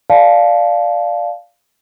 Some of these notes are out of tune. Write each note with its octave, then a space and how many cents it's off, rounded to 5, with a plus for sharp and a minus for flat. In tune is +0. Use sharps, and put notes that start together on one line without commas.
D5 +0 F5 +0 A5 -25